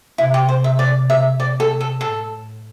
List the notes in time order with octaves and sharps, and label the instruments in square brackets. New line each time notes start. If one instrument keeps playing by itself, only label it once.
[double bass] C3 [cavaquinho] E4
[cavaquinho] G4
C5
E5
D5
E5
[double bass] C3 [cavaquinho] D5
[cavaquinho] A4
A4
[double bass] A2 [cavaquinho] A4